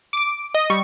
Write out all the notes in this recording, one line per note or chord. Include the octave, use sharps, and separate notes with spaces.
D6 D7
D#5
G3 C#6